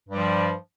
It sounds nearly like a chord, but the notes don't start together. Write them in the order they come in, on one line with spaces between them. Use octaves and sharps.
G2 G3 F3